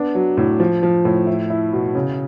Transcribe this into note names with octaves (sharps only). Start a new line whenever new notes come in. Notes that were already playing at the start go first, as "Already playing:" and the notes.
Already playing: B3 D4
F#3
A2
F3
F3
A2
E4
E4
B2
C#3